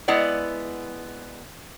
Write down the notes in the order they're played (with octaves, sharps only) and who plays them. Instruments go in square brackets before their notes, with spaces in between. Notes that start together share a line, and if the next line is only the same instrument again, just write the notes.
[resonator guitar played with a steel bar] G#3 B3 E4 D5 F#5